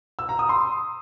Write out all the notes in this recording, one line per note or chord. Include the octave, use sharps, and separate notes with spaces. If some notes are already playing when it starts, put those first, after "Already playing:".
E6
A#5
D#6
C6